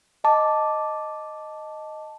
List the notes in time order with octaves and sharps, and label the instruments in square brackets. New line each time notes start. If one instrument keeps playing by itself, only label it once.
[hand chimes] D#5 A5 D6